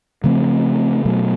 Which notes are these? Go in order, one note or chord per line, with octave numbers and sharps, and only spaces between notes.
C#3 F3 A3 C4
B2 F#3 A3